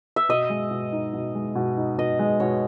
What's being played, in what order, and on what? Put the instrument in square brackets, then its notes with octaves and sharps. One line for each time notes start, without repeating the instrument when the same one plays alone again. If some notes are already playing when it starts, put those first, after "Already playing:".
[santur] E5
[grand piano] B2 [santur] D#5
[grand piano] G#3
B2
D#4
B2
G#3
B2
D#4
[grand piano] B2 [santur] D#5
[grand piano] G#3
[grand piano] B2 [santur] C#5